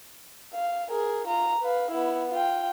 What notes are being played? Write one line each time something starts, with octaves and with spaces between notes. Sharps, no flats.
F5
G#4 A#4
F4 A#5
B4 F5
B3 E4
F4 G5